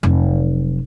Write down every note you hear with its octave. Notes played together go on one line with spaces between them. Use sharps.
F1 F#3